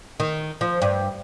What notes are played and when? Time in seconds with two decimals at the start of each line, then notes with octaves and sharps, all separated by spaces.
0.20 D#3
0.61 F3
0.82 G2